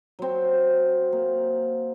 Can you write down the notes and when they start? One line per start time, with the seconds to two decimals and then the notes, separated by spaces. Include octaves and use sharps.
0.19 F#3 C4
1.12 A#3